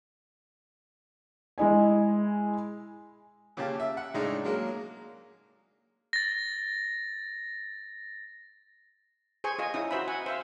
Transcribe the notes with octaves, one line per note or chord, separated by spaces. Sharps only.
G#3 E4 D#5 G#5
A#2 C#3 C#4 F4 G4 A5
E5
F#5
A2 C#3 G#3 D4 D#4
F#3 G#3 A#3
A6 A#6
G#4 C5 G#5 C#6
F4 G#4 D#5 G#5
C#4 D#4 E4 D#6
F#4 C5 E5 B5
F#5 G#5
C5 E5 F5